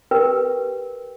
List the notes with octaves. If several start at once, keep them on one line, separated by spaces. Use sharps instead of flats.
G4 A#4 B4 G5